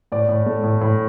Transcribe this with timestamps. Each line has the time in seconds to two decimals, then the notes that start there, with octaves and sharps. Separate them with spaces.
0.12 A2 D5
0.29 A2
0.46 A3
0.64 A2
0.81 A2